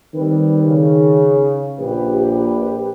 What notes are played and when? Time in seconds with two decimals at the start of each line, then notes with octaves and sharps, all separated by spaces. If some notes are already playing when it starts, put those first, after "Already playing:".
0.14 D#3 G3 C4 B4
0.65 C#3
1.80 A#1 G4 B4